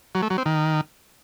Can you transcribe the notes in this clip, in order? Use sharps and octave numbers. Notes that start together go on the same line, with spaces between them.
F#3
A3
F#3
C4
D#3